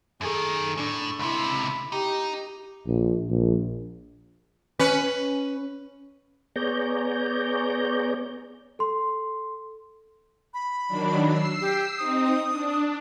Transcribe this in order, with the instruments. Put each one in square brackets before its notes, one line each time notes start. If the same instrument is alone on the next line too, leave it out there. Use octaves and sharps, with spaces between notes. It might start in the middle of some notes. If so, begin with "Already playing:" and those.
[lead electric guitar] F#2 D#3 [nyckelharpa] G#4 A4
[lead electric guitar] A2 [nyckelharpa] D4
[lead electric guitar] C#2 C3 [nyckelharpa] E4 B5
[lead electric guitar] D#4 [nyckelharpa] G4
[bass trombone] A#1
A#1
[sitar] C#4 B4
[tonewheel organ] B3 G#4 C#5 D5 A#5 G6
[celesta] A4 C6
[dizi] B5
[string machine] D#3 F#3 D4
E6 C7
[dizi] G4
[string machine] C4 D#4 [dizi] D#6
[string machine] D4